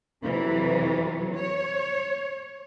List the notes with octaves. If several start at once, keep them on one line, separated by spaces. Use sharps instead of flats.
F2 C3 E3 F#3
C#5